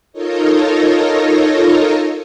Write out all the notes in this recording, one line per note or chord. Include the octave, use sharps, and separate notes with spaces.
D#4 F4 A4 A#4 C#5 D#5